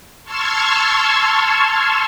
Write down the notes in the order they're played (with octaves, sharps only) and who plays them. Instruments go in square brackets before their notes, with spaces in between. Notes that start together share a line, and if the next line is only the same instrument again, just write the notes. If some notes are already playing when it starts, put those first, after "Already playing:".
[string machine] A5 C6 C#6 E6 F6 G#6